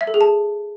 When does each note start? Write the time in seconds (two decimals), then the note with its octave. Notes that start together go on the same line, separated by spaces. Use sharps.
0.01 E5
0.07 A4
0.14 G#4
0.21 A5